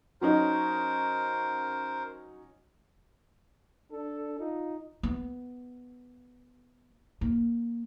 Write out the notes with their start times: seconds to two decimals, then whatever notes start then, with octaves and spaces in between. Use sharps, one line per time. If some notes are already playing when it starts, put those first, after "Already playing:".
0.21 F#3 C#4 D#4 A#4 C5
3.92 D4 A4
4.39 D#4 F4
5.03 B3
7.21 A#3